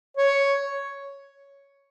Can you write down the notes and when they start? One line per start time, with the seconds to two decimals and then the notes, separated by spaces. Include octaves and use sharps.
0.17 C#5